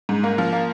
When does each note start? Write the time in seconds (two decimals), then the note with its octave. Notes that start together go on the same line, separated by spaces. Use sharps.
0.09 G#2
0.24 A#3
0.38 F3
0.53 A#3